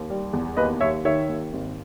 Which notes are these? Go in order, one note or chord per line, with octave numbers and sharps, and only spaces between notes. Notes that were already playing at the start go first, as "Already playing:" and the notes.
Already playing: D#2
G3
E2
D#2 B4 D#5
D#2 C#5 E5
D#3 C#5 E5
D#2
G#1